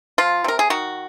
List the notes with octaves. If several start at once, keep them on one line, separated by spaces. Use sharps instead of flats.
F3 F4
C3 A#4
G#4
D#3 F#4